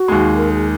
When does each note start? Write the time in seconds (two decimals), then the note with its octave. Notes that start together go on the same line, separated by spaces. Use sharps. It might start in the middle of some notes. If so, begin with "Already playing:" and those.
Already playing: F#4
0.08 D#2 D#3 G#3
0.37 A#4
0.51 G#4